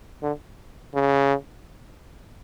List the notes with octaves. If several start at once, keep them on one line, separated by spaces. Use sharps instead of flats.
D3
C#3